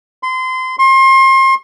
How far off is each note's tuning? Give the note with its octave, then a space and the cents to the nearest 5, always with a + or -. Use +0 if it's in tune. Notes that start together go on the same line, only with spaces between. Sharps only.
C6 -25
C6 +35